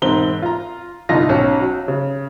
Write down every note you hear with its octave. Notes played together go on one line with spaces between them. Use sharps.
E1 G#2 C4 G7
F4 A#5
G1 C2 D#4 F4 A#6
B1 C#4
F#3
C#3